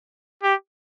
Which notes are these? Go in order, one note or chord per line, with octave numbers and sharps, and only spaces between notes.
G4